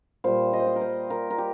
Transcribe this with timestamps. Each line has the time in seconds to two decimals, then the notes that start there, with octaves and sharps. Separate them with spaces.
0.24 A#2 G3 C5
0.53 D#5
0.60 C5
0.67 D#5
0.76 A#4
0.81 C5
1.10 A#4
1.30 A#4
1.38 G4